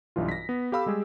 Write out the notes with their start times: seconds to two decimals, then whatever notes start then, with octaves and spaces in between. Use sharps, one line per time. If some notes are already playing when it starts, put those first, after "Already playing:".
0.16 B1 G2 E3 F4
0.29 A#6 B6
0.49 B3
0.72 G4 A4 F5 B5 D6 E6
0.86 G3 G#3 G4 G#4